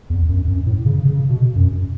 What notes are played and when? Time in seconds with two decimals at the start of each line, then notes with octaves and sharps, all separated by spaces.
0.10 E2
0.29 F#2
0.48 F#2
0.66 A2
0.86 C#3
1.05 C#3
1.30 B2
1.56 F#2